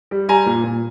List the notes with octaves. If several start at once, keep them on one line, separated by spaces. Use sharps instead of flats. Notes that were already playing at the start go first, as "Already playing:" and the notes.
G3
G3 G#5 A#5
A#2
A#2